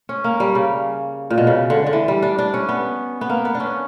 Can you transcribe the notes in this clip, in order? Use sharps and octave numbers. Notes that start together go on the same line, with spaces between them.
C#4
A#3
G3
C#3
A#2
B2
C#3
D3
D3
E3
G3
D4
D4
C#4
B3
B3
A#3
B3
D4
C#4